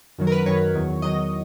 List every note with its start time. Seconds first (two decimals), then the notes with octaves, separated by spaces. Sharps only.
0.18 F#2 D#3 F#3
0.27 A#4
0.32 B4
0.46 F#2 D#3 F#3 C#5
0.75 E2 D#3 F#3
1.02 E2 D#3 F#3 D#5